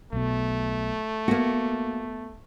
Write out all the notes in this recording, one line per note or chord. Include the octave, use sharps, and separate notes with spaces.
B1 B2 A3
A#3 B3 F#4